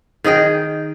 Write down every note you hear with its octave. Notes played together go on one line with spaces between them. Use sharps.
D#3 G#4 D#5 G5